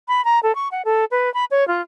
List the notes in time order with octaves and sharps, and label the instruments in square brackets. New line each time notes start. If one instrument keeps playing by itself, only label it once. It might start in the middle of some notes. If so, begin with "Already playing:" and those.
[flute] B5
A#5
A4
C#6
F#5
A4
B4
B5
C#5
F4